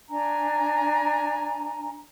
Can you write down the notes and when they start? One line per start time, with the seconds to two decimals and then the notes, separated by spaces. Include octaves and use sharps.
0.09 D4 G#5 A#5